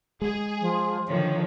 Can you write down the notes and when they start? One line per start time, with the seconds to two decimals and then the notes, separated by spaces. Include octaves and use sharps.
0.22 G#3 G#4
0.61 F3
1.08 D3 D#3 F3 C#5